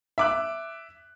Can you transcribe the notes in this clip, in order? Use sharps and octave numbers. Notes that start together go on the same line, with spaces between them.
E5 D6 F#6